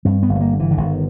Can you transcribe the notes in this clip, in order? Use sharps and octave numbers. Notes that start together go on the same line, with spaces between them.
G2 C4
B3
G1
A3
A#3
D3
E3
D3
G1 D#3